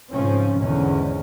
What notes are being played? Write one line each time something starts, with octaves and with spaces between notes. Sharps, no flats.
G#2 C#3 F3 C4 C#4
G#1 E2 G#2 D3 C#4